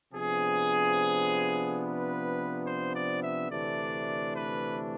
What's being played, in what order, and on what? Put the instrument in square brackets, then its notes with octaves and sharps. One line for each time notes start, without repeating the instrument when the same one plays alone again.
[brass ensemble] C3 F3 B3 D4 G#4
B4
C5
D5
E5
D2 C3 E3 A3 D4 D5
B4